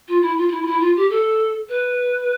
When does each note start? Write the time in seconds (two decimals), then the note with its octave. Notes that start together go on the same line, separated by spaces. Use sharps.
0.08 F4
0.22 E4
0.38 F4
0.48 F4
0.51 E4
0.62 F4
0.67 E4
0.81 F4
0.96 G4
1.10 A4
1.69 B4